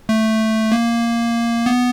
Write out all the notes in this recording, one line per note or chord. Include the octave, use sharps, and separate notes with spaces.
A3
A#3
B3